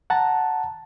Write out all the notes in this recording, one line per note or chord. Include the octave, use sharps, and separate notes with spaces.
F#5 A5 A#5